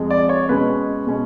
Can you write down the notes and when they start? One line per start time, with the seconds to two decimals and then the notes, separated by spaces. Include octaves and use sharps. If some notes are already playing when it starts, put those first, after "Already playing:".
Already playing: F2 F3 G#3
0.10 D5
0.29 C#5
0.49 B2 G#3 C#4 B4
1.07 B2 G#3 C#4